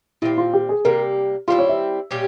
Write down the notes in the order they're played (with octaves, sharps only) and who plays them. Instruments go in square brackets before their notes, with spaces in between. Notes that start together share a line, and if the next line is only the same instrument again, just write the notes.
[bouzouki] A#2 G3 C4 [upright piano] E4
[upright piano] F4
G4
G#4
[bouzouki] C3 G3 A#3 [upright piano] A#4
[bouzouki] G3 C4 E4 [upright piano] F4
[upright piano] C#5
E5
[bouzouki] A#2 G3 C#4 G4